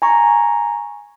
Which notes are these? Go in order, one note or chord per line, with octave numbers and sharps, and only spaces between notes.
G#5 A#5 C#6